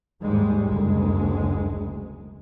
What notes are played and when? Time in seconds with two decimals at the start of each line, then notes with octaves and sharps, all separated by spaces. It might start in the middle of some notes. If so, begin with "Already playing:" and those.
0.22 D#2 G#2 G3 G#3
0.66 F#1 D2 G#3